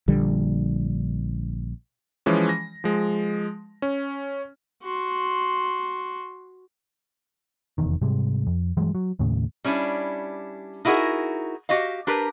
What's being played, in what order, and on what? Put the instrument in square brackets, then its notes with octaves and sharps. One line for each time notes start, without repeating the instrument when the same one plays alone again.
[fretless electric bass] A#1 D3 G3
[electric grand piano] E3 F3 G#3 C#4
A#6
F3 G#3
C#4
[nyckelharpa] F#4 C6
[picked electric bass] F1 E2 D#3
G#2 C3 G3 G#3
F2
G2 E3 F#3 G#3
F#3
D#2 A2 C#3
[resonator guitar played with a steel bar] G3 C#4 D4 E4
D#4 E4 F#4 G#4 A#4
F#4 G4 D#5 F5
D4 G4 A#4 B4